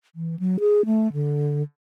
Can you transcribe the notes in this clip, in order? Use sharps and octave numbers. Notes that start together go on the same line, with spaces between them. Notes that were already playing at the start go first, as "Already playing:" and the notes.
E3
F#3
G#4
A3
D3